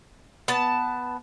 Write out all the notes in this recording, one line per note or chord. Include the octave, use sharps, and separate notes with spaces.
B3 A5